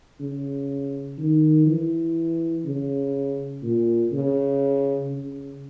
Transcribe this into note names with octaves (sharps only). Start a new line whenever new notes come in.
C#3
D#3
E3
C#3
A#2
C#3
C#3